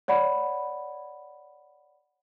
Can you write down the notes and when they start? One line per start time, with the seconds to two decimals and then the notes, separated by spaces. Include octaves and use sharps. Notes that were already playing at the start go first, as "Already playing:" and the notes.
0.08 C#5 D5 F#5 B5